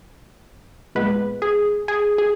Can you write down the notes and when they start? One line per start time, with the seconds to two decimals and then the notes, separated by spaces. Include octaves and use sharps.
0.95 A#2 G#3 B3 B4
1.42 G#4
1.88 G#4
2.18 G#4